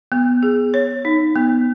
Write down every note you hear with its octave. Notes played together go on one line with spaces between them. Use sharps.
B3
G#4
C#5
D#4
B3